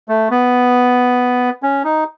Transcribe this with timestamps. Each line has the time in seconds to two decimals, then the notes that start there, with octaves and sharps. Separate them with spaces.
0.08 A3
0.31 B3
1.63 C#4
1.84 D#4